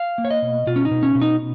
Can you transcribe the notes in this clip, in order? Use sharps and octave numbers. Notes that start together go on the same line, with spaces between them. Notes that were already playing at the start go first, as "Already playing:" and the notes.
Already playing: F5
A#3
C#5
D#5
B2
B2 F4
C#4
D#4
B2
C#4
B2
D#4